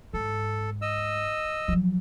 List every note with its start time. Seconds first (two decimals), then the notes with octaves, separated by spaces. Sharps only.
0.14 G#2 A4
0.82 D#5 E6
1.68 F3 F#3